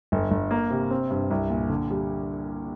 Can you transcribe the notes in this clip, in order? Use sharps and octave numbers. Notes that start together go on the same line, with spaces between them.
G1
G1
A#3
C3
C4
G2
C2
A#2
D3
G3